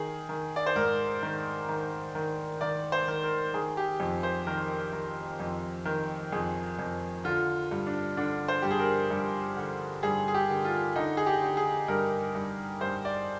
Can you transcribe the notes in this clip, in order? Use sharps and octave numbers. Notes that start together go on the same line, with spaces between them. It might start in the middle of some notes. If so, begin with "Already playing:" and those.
Already playing: D#3 G#4
D#3
D5
C5
G#2 A#4
D#3
D#3
D#3
D#3 D5
C5
D#3
A#4
D#3 G#4
G4
F2
C5
D#3 A#4
D#3
F2
D#3
F2 G#4
F2
D3 F4
G2
D4
D3 D4
C5
G2 G4
G#4
A#4
G2
D3
G2 G#4
G#4
G4
D3
F4
D3 D#4
G#4
G4
D3
G#4
G2 A#4
G2
G2 C5
D5